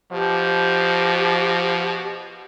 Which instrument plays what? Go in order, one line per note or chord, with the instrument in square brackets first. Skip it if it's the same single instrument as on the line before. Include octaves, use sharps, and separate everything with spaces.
[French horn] B2 [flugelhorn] F3 [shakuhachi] G4